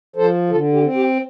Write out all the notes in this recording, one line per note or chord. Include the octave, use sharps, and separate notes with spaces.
F3 A4 C5
D3 F4 A4
G4
C4
G4